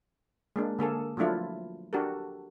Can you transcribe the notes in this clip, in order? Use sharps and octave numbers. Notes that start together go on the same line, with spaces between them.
G#3 A#3 D4
D3 A#3 G#4 A4
F3 F#3 A3 D4 E4 F4
D4 F#4 G4 A4 A#4